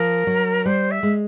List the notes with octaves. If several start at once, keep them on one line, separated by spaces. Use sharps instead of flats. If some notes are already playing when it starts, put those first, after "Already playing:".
Already playing: F3 A#4
F#3
G3 C5
E5
G#3